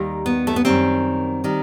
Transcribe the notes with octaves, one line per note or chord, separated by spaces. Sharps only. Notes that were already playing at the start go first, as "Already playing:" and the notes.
Already playing: D#2 D#3 G3
B3
A3
B3
F#2 D#3 G3 C4
D#3 G3